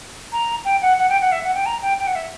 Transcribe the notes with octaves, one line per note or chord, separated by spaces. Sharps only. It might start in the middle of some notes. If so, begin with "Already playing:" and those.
A#5
G5
F#5
F#5
G5
F#5
E5
F#5
G5
A#5
G5
G5
F#5
E5